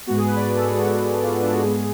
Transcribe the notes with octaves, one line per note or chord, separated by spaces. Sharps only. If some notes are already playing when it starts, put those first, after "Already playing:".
G#2 G#3 B3 F#4
G#4
B4
D5
B4
A4
G#4
F#4
F#4
F4
D4
F#4
G#2 G#3 B3 G#4